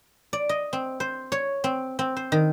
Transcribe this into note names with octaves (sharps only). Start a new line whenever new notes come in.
D5
D#5
C4
C5
C#5
C4
C4
C5
D#3